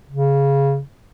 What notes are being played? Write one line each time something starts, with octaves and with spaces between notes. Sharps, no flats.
C#3